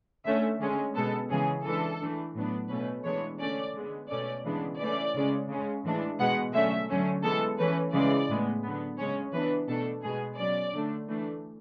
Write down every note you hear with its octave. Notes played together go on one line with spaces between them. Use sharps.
D3 A3 C#4 E5
D3 G#3 C#4
B2 G#3 B3 A4
C#3 E3 G#3 C#4 G#4
E3 G#3 D4 A4
E3 A3 D4
A2 F#3 B3 D4
B2 A3 C#4 B4
E3 G#3 B3 D4 C#5
D3 A3 C#4 D5
D3 G#3 B3
B2 A3 C#4 D5
C#3 E3 G#3 B3 D4
E3 A3 C#4 D5
C#3 G#3 C#4
C#3 G#3 C#4
A2 E3 G#3 D4
B2 G#3 B3 F#5
D3 F#3 A3 C#4 E5
D3 F#3 A3 C#4
E3 G#3 B3 A4
E3 A3 C#4 B4
C#3 E3 G#3 D5
A2 G#3 B3
D3 F#3 B3
C#3 G#3 C#4 C#5
E3 B3 D4 B4
B2 A3 D4 A4
B2 G#3 B3 G#4
B2 F#3 C#4 D5
D3 A3 D4
E3 A3 D4